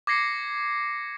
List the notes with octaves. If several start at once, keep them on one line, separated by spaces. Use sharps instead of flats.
D6 G#6 A#6 C7 C#7